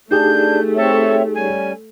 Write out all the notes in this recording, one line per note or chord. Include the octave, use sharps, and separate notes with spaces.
A3 D4 D#4 G4 G#4 G6
C4 A4 C#5 E5
G3 C#4 G#5